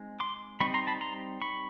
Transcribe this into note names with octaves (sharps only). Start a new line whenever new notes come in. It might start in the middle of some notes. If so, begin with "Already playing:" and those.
Already playing: G#3 C4 D#4
C6 D6
G3 C4 D#4 B5 C#6
A#5 C6
A5 B5
A#5 C6
B5 C#6